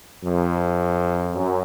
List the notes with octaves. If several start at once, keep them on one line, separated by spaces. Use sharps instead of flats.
F2
F#2